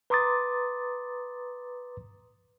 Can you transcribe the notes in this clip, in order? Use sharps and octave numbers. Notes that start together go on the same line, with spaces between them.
B4 A#5 C6 D6 D#6 A6